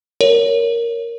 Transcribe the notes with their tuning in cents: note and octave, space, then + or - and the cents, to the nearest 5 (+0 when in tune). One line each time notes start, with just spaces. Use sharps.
A#4 +0 C#5 +10